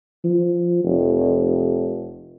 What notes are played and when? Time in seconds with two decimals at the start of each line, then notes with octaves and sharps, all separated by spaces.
0.24 F3
0.84 F1